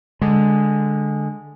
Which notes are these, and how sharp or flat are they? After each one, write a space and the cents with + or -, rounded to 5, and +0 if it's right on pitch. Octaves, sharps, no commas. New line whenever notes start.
D3 +0 G#3 -5